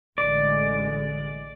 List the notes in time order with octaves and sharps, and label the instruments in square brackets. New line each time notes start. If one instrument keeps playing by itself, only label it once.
[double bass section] A1 D3 G#3 [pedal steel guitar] D5